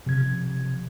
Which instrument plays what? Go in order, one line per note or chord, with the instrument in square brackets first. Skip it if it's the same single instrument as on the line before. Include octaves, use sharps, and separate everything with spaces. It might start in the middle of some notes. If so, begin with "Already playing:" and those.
[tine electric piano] C3 F3 G#6